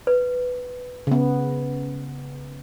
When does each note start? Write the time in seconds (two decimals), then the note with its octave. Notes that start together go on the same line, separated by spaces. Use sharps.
0.07 B4
1.07 C#3 B3